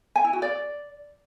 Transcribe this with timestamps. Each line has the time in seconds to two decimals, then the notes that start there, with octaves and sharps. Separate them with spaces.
0.16 G#5
0.24 E4
0.33 F#4
0.42 D5